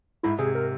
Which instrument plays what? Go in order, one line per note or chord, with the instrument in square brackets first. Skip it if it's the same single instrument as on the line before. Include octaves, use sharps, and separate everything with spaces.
[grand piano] G#2 [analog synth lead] E4
[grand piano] C3 [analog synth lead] G#4
[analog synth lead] A#4